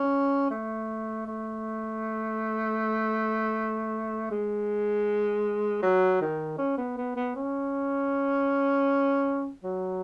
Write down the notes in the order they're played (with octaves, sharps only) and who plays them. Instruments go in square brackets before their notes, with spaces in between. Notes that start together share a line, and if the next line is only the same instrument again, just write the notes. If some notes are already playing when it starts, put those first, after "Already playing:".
Already playing: [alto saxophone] C#4
A3
A3
G#3
F#3
D#3
C#4
B3
B3
B3
C#4
F#3